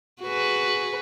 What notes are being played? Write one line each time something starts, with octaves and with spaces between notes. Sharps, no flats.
F#4 G#4 B4